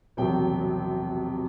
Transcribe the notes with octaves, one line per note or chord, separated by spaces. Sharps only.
E1 A#1 C3 F#3 G5